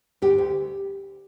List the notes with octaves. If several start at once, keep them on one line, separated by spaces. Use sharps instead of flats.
D2 G4
D2